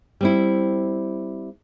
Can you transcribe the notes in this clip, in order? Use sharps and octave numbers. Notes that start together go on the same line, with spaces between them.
G3 C4 E4